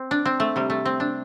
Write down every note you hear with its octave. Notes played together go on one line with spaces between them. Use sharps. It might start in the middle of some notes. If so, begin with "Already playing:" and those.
Already playing: C4
D4
C4
A3
C3 G3
A3
C4
D4